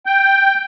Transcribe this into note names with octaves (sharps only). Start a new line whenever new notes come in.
G5